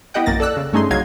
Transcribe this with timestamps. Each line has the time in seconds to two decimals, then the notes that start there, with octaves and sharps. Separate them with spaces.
0.14 B3 E4 G4 D#5 F#5 G5
0.26 A#1 F#2 A#3 A6 A#6
0.40 A4 D5 E6 F#6
0.57 C#3
0.73 G2 A3 C#4 D#4 G#4 C6
0.90 C2 C#3 F#3 D#4 F5 G#6